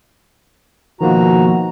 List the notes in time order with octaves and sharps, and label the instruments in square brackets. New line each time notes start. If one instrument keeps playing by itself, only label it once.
[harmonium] B2 F#4 A#5 [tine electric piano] D#3 F3 A#3